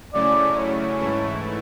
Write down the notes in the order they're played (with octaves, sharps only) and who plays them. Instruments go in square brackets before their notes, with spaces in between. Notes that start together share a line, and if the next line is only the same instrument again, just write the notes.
[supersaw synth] C#3 F#3 A3 C#4 E4 [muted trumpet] D5
[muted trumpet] C#5
[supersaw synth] G#2 E3 A3 E4